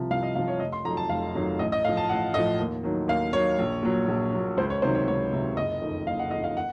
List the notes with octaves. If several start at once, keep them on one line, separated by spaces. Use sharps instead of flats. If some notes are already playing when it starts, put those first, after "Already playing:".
Already playing: C2 C3 F3
C2 F5
D#5
C3 F3 F5
C#5
F1 D#5
C6
F2 D#3 F#3 A#5
A5
F1 F5
F2 D#3 F#3
A1 D#5
D#5
A2 F3 F5
A5
A1 F#5
A2 F3 D#5
D#2
D#3 F#3
D#2 F5
D#3 F#3 C#5
A#1
A#2 F#3
A#1
A#2 F#3
C#2 C5
C#5
C3 D#3 F#3 C5
C#5
C#2 C#5
C3 D#3 F#3
F#1 D#5
F2 D#3
F#1 F5
F#5
F2 D#3 D#5
F5
F#5